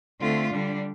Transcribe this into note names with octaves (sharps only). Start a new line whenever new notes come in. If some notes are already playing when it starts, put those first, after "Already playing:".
D3 A3 C4 F4
D3 G3 D4